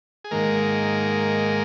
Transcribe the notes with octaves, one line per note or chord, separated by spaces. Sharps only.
G#4
G#2 D#3 G#3 A#3 A#4